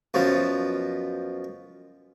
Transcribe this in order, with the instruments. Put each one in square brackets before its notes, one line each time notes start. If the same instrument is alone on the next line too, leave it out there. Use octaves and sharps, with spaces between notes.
[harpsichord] F#2 B2 F3